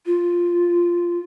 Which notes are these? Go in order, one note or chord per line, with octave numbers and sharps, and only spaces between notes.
F4